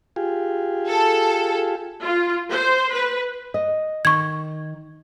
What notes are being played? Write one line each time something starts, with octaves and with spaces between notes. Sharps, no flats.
F4 G4 G#4
A4
F4
C5
B4
D#5
D#3 C#6 G#6